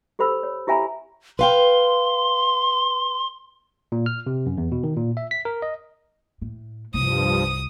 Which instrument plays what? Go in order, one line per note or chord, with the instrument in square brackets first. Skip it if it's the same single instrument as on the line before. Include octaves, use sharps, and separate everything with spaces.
[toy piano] G4 A4 C5 B5 E6
C#5
E4 G4 E5 G#5 A#5 B5
[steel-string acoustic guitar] B4 F5 G5 [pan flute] C6
[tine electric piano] A#2
F6
C3
F#2
E2
B2
D#3
A#2
E5
B6
A#4
D#5
[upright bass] A2
[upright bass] C2 [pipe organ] G2 F3 [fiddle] D#6